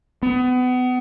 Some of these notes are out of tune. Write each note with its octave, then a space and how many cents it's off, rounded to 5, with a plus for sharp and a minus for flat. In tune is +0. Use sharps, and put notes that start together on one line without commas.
B3 +30